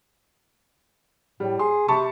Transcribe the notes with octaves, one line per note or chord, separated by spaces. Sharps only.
A2 G3
G#4 C6
C3 A5 B5 C#6